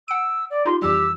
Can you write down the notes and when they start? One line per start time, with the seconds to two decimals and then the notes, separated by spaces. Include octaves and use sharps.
0.08 F#5 E6 D7
0.50 D5
0.66 D#4 F4 G4 C6
0.82 F2 E3 G3 G4 E6